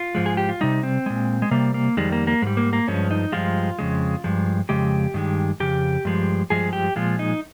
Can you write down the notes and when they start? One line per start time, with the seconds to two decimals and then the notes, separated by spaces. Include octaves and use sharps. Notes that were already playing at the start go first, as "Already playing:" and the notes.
Already playing: F4
0.15 G#2 F3 G#3
0.26 G#4
0.37 G4
0.49 F4
0.61 C3 G3 D#4
0.83 C4
1.06 A#2 G#3
1.42 G#3
1.51 C3 G3 A#3
1.74 A#3
1.97 F2 D#3 G3 G#3
2.12 A#3
2.27 A#3
2.42 G#2 G3 G#3
2.57 A#3
2.73 A#3
2.88 G2 F3 G#3 C#4
3.11 D#4
3.32 G2 F3 G#3 F4
3.79 F2 C#3 G#3
4.24 G2 F3 G#3
4.69 F2 C#3 G#3 G4
5.14 G2 D#3 G#3
5.60 F2 C#3 G4
6.05 G2 F3 G#3
6.50 G2 F3 G#3 G#4
6.73 G4
6.96 A#2 F3 G#3 F4
7.19 D#4